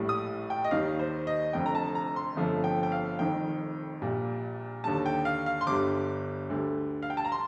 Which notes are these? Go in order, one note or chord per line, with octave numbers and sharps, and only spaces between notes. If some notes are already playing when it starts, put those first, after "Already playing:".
Already playing: A#1 A2 G3
D#6
G5
D#5
D#2 D#3 G3 F5
C5
D#5
F1 F2 D3 G5
A#5
A5
A#5
C6
G1 F2 D3 F3 A3
G5
G5
F5
F1 F2 D#3 G5
A#1 A#2 G3
D#2 D3 G3 A5
G5
F5
F5
C6
G1 G2 D3 G3 D6
D2 D3 G3
F5
G5
A5
A#5
C6